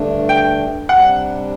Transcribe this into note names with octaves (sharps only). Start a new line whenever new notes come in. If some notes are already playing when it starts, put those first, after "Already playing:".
Already playing: G2 D3 A3 D4
G5
C3 G3 D4 F#5